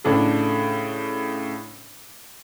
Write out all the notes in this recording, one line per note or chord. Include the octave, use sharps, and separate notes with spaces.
A2 C#3 D4 A4